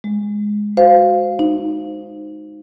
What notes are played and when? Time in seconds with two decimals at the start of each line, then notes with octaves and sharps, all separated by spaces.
0.04 G#3
0.77 F#4 C5 F5
1.39 D#4